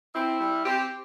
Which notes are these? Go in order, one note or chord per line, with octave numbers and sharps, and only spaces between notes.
C4 E4
G3
C4 G4